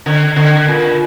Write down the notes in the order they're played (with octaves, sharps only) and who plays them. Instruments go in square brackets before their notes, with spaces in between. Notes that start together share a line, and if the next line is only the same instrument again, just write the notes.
[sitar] D3
D3
A#2